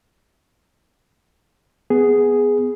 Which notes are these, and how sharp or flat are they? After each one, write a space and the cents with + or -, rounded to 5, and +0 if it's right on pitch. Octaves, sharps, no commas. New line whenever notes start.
B3 +10 G#4 +0